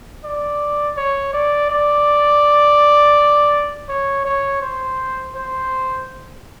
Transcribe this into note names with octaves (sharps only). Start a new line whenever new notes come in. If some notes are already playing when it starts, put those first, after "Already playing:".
D5
C#5
D5
D5
C#5
C#5
C5
C5